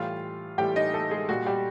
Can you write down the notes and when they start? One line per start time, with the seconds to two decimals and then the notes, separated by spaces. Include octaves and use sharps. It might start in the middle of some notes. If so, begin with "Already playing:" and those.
Already playing: A2 E3 G3 F4 F5
0.58 A2 E3 G3 G4 G5
0.76 D#4 D#5
0.94 A3 A4
1.11 G#3 G#4
1.29 A#2 G3 F#4
1.47 G3 G4